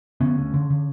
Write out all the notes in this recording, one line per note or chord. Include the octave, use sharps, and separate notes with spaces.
D3 B3 C#4
D2
D3
D3